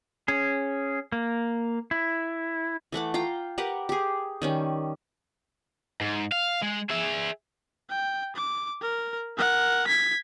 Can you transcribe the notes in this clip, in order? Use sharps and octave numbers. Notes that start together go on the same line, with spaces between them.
C#4 G#4
A#3
E4
E3 A3 F#5 D6
F4 G5 A#5 C6
G4 A#4 B4 F#5
G4 G#4
D#3 G3 C#4
G#2
F5
G#3
G#4 E5
G5
D6
A#4
A#4 F#5
G#6 B6